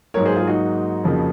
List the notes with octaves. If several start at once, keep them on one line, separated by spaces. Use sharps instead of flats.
G#2 F#3 A#3 A#4 C#5
G#4 C5
F4 G#4
D#4 F#4
F2 C#3 F3 A#3